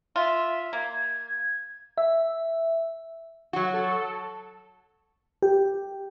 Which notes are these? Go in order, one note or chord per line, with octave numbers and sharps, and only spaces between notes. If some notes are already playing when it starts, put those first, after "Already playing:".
F4 E5
A#3 G#6
E5
F#3 F#4
A4
G4